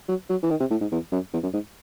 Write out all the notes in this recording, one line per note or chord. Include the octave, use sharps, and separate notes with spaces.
F#3
F#3
E3
D#3
C3
A2
G#2
E2
F#2
E2
F#2
G#2